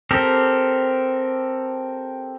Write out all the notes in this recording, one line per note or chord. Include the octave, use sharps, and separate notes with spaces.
C4 G4 A4 A#4